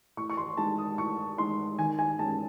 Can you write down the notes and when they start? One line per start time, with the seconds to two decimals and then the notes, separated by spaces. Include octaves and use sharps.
0.17 A2 C#6
0.30 C#6
0.37 C6
0.57 G#3 D#4 A5
0.78 D#6
0.98 A2 C#6
1.38 G#3 D#4 C6
1.78 D#3 G#5
1.99 G#5
2.19 G#3 A5
2.23 C#4